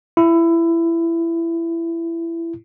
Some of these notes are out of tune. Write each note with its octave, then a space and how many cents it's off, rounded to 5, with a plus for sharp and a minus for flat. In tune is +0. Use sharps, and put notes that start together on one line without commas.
E4 +20